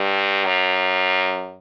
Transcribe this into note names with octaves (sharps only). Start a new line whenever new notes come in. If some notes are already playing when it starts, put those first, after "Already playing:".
Already playing: G2
F#2